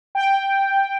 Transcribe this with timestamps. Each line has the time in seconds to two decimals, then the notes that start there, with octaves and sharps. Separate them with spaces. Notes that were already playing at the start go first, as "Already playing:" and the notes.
0.15 G5